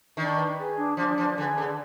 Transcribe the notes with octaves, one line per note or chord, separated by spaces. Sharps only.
D#3 D4
B4
G#4
D4
F3 D4
F3 B4
D3 G#4
D3 D4